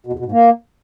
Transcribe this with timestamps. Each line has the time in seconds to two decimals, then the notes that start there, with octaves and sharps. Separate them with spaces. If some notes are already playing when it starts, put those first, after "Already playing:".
0.06 B2
0.13 E2
0.19 B2
0.25 G#2
0.32 A#3